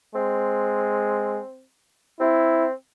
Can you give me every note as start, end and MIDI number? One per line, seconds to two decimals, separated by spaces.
0.15 1.40 56
0.15 1.63 60
2.20 2.73 60
2.20 2.65 64